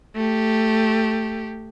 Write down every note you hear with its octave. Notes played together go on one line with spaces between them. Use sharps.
A3 G4